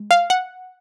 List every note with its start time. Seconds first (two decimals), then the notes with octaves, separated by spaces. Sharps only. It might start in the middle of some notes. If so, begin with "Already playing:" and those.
Already playing: G#3
0.11 F5
0.30 F#5